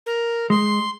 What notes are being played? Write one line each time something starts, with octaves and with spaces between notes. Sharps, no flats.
A#4
G#3 C6